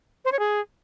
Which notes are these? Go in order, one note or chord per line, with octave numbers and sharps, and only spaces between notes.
C5
C#5
G#4